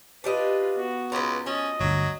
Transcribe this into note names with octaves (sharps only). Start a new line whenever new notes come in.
D4 F4 G4 B4 D#5
B3 F#4
C#2 B4 A#5
F3 C#4 D#5
G1 D2 F#3